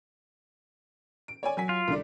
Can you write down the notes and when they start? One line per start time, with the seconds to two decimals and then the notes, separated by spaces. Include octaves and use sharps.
1.28 D7
1.43 C#5 D5 G#5
1.57 F#3 G#5 B6
1.69 F4
1.88 C2 D3 D5